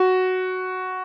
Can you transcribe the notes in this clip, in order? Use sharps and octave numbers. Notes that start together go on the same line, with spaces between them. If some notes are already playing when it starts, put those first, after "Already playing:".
Already playing: F#4